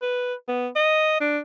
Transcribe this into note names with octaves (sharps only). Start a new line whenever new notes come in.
B4
B3
D#5
D4